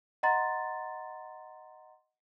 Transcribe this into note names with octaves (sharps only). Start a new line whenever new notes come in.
D#5 F#5 A#5 C6 A6